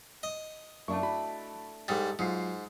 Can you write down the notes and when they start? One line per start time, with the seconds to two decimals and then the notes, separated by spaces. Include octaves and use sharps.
0.23 D#5
0.88 F#2 A3 A#3 D4 E4 C#6
1.02 F#4 B5
1.88 G#2 G3 A4 A6
2.19 G#2 F#3 F4 C7